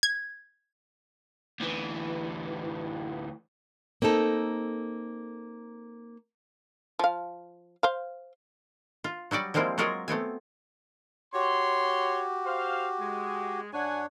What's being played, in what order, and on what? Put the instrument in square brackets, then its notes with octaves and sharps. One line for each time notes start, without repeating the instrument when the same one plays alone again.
[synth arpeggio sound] G#6
[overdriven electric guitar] D2 E3
[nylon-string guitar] A#3 C4 D#4 A4
[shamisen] F3 F5
C5 F5
[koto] F4
F#3 G3 F#4 D5
F3 G3 G#3 A#3 C4 E4
F#3 G#3 F4 F#4 G#4 A#4
A3 B3 C4 G#5
[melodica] F#4 G4 [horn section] C#5 C6
[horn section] C5 F5
G#3
[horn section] F#2 F#5 G#5 [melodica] D4 C#5